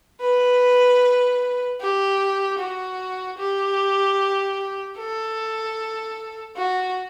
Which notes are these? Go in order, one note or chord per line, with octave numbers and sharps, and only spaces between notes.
B4
G4
F#4
G4
A4
F#4